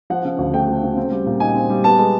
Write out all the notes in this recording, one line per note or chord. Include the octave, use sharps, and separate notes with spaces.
F3 F#5
C#3
D2
A3 G5
F3
C#3
C4
G3
A#2
D#4 G#5
C4
G3
B3 A5
G#3